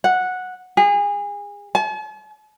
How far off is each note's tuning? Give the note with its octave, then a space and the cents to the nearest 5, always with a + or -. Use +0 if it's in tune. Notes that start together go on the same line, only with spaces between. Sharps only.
F#5 -10
G#4 -30
A5 -45